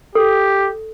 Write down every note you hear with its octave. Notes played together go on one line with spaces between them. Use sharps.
G4 A4